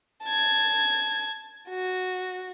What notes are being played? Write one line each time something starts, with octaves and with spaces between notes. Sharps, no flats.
A5 G#6
F#4